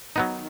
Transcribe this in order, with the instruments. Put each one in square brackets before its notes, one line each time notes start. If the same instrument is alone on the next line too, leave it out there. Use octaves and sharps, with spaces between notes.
[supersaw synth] D#3 [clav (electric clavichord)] F#3 B3 D#4